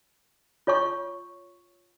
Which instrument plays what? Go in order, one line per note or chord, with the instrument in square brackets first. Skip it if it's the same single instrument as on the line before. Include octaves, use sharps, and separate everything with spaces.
[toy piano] F4 C#5 A5 C#6